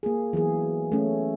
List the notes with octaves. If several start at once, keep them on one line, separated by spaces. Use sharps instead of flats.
A#3 G#4
E3 F#3 B3 G#4
A3 C#4